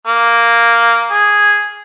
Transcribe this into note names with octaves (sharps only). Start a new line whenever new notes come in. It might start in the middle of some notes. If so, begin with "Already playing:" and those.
A#3
G#4